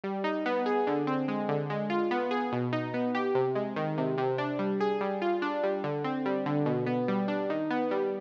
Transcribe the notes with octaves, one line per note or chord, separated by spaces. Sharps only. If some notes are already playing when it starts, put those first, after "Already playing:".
G3
D#4
B3
G#4
D3
C4
G#3
D3
G#3
F4
B3
G#4
B2
D#4
B3
G4
C3
G#3
D#3
C3
C3
D4
G3
G#4
G3
F4
D4
G3
D3
C4
G3
D3
B2
B3
G3
D4
D#3
B3
G3